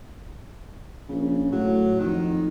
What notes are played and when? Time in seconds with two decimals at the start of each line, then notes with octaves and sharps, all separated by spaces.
1.09 A#1 C#3
1.52 A2 F#3
2.00 F2 D#3